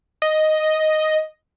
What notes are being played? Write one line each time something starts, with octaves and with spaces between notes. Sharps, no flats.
D#5